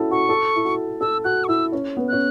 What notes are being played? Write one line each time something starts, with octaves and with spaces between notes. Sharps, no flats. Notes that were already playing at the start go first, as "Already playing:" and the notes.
Already playing: C#4 E4 F#4 A4
F#4 C#6
A4
E4
F#4
A4 E6
F#4 F#6
C#6
E4 E6
C#4
B3
C#4 F#6